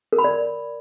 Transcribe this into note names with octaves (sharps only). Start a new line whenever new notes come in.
A#4
B5
D5